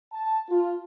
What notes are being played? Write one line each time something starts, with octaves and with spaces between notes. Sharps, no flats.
A5
F4